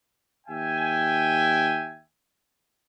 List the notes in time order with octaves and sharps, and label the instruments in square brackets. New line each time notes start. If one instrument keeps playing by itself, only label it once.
[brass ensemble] D#2 E5 G5 G#5